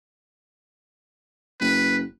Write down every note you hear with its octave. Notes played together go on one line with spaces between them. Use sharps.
F#1 B4